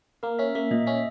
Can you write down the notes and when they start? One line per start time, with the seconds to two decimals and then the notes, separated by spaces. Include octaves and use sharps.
0.23 A#3 A#4
0.39 C#4 E5
0.55 A#3 E5
0.71 A#2 D#5
0.87 C#4 E5